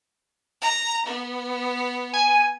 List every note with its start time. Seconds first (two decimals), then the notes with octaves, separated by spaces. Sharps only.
0.62 A#5
1.07 B3
2.13 G#5